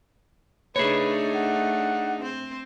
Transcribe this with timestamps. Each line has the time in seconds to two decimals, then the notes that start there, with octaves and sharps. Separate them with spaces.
0.76 A3 D4 D#4 G#4 B4 C#5
1.35 F#5
2.21 C4 C5